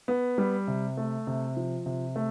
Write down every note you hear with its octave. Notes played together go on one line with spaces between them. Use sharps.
B3
G3
C3
A3
C3
F3
C3
A3